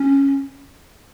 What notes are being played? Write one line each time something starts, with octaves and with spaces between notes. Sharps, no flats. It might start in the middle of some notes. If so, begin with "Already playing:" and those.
Already playing: C#4